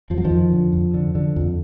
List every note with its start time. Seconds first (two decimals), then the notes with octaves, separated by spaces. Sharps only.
0.10 F2 F3
0.18 F#3
0.24 D#3 F3
0.31 F2
0.52 D3
0.73 F2
0.94 D3
1.15 D3
1.36 F2